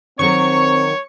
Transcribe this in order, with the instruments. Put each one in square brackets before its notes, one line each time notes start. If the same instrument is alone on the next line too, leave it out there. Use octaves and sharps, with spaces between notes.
[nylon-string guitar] D#3 F#3 A#4 [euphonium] C4 [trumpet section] C#5 [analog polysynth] C#6